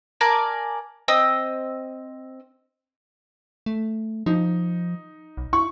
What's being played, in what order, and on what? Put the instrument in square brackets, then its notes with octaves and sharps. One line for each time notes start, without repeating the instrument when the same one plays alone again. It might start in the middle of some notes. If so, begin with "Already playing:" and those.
[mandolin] A#4 D5 G#5 A5
C4 D#5 D#6 E6
[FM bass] A3
[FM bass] F3 [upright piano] D#4
[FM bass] B1
[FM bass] E4 [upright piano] C#6